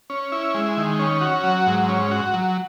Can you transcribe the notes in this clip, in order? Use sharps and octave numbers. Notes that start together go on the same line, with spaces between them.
C#4
E4
G#3
D#3
C#4
F#4
F#3
G#2
C#4
F#4
F#3